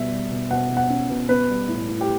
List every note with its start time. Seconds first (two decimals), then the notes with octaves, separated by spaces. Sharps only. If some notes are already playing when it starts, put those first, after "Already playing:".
Already playing: B2 G3 E5
0.11 G3
0.31 B2
0.51 B2 F#5
0.70 B2
0.77 F#5
0.90 C#4
1.09 B2
1.29 B3 B4
1.49 G3
1.68 A2
1.88 A2
2.01 G4